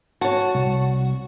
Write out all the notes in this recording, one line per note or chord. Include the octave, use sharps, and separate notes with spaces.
F#4 C#5 A5
C2